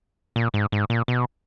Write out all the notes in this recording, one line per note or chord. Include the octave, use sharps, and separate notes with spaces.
A#2
G#2
G#2
A#2
B2